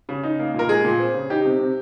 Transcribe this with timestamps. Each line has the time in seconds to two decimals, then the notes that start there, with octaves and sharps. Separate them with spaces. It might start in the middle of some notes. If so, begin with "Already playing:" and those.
0.09 C#3
0.23 D#4
0.39 A#3
0.54 A#2 A#4
0.69 G#3 G#4
0.85 A#2
0.99 C4
1.14 C#3
1.30 D#4 G4
1.45 C3
1.60 C3